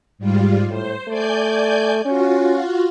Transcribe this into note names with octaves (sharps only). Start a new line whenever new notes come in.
G#2 G3 F4
A2 C5
A3 D5 G#5 G6
C#4 F4 F#4